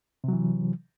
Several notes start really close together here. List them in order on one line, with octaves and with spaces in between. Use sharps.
C3 F#3 E3